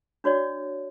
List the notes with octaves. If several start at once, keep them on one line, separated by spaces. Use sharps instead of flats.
D4 F#4 C#5 D5